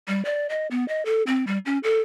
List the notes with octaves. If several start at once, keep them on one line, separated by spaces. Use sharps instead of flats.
G3
D5
D#5
B3
D#5
A4
C4
G3
C#4
A4